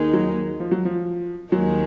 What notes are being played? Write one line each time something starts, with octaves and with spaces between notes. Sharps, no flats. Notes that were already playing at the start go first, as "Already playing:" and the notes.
Already playing: D#2 D#3 G#3 D#4
F#3
F3
F#3
F3
D#2 D#3 F#3 G#3